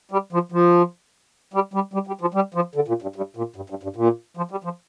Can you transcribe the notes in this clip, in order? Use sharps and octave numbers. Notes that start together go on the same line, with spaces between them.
G3
F3
F3
G3
G3
G3
G3
F3
G3
F3
D3
A#2
G2
G2
A#2
G2
G2
G2
A#2
F3
G3
F3